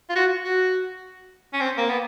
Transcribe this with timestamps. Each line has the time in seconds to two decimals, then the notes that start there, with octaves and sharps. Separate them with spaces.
0.09 F4
0.16 F#4
0.44 F#4
1.53 C#4
1.60 C4
1.77 A#3
1.89 B3